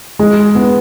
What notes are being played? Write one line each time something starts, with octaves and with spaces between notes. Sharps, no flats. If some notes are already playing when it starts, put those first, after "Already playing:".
G#3
B3